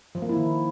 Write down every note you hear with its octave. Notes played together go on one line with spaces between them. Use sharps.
F3
A#3
E4
D#3